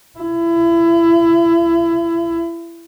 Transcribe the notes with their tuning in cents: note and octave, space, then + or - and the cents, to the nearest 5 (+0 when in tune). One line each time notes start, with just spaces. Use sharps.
E4 +30